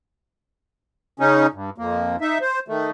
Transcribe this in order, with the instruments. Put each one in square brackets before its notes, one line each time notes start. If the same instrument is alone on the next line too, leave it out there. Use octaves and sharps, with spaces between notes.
[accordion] C#3 C#4 D#4
G2
F2 A#3
D#4 E5
C5
D#3 A3